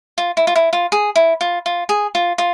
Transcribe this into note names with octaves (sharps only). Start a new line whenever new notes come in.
F4
E4
F4
E4
F4
G#4
E4
F4
F4
G#4
F4
F4